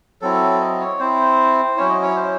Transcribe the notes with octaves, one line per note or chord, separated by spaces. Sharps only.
F#3 C4 E4 A4
D#5
C#5
C4 E4 C5
F#3 C#4 E4 C#5
D#5
C#5
C5